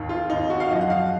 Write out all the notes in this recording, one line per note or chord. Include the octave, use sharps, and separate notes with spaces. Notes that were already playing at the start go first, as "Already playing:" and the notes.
Already playing: D#2 D#3
F4
D#2 D#3 D#4
F#4
F5
F#2 F3 D#5
F#5
F5